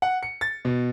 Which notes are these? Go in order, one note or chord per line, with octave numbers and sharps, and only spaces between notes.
F#5
C#7
A6
B2